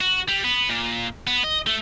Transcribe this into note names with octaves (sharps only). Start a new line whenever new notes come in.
F#4
G3
B3
A#2
B3
D#5
A3